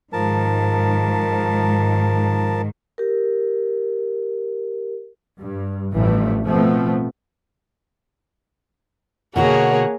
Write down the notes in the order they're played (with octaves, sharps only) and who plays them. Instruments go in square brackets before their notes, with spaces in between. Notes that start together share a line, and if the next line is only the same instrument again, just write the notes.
[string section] G#2 D#3 [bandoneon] F3 A#4 A5
[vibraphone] G4 A#4
[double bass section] G2
A1 G2 E3 F3 A3
B2 F3 A3 B3 C4
[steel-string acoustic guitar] B2 D3 F#4 [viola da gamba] A#3 G#4 [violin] A#4 C#5 [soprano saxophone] F#5